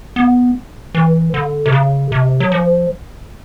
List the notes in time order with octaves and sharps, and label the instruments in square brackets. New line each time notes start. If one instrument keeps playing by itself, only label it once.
[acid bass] B3
E3
D3
C3
C#3
C3
F#3
F3